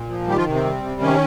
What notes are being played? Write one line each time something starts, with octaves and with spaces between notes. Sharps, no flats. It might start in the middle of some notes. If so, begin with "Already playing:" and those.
Already playing: A#2
F3
D#3 G3 G4
F3 F4
C3
C4
G3
C3
D#3 C#4